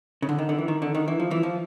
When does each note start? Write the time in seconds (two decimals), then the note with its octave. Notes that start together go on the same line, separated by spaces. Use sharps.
0.22 C#3
0.29 D3
0.39 D#3
0.49 D3
0.58 E3
0.68 D#3
0.82 D3
0.95 D#3
1.08 E3
1.20 F3
1.31 E3
1.43 F3